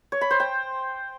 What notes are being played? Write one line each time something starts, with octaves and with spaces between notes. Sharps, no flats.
C#5
B5
C5
G5